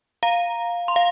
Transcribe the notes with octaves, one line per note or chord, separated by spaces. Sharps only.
F5 A#5
C6
F5